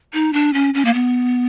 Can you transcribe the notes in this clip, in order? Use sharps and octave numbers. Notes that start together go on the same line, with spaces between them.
D#4
D4
C#4
C#4
A#3
B3